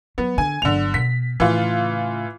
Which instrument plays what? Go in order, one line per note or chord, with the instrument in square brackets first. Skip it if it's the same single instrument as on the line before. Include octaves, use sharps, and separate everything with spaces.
[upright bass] F#3 [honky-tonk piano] B3
[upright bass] D3 [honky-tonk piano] G#5
[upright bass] G1 F#3 [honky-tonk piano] D3 F7
[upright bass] B2 [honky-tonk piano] B6
[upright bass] A2 C#3 [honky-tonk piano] E3 F4